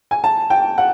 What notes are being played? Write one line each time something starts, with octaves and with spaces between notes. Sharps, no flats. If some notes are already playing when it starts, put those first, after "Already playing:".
G#5
A5
G5
F#5